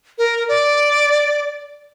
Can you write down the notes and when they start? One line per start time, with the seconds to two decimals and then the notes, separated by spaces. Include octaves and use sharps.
0.18 A#4
0.48 D5